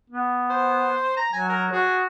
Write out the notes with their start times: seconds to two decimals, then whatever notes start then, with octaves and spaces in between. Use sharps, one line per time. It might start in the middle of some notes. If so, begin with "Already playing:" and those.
0.10 B3
0.50 C5
1.17 A#5
1.33 F#3 G#5
1.49 A#4
1.72 F#4 G#4